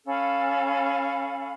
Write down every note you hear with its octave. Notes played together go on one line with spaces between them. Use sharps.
C#4 A4 F5 B5